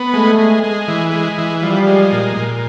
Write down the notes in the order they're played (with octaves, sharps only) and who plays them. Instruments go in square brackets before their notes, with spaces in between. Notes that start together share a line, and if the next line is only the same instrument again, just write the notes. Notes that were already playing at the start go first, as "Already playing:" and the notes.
Already playing: [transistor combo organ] B3
[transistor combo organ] G#3 [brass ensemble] A3
[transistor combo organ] G#3
G#3
E3
G#3
E3
[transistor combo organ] F3 [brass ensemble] G3
[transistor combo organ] G#3
A#2
A#2